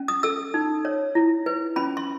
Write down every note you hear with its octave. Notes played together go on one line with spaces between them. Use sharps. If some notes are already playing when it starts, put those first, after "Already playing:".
Already playing: C#4
D#6
A4 E6
D#4
C#5
E4
B4
C#4 B5
C6